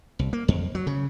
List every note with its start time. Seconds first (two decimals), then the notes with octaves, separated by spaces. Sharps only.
0.19 C2
0.33 A#3
0.48 F2
0.75 F#3
0.87 C#3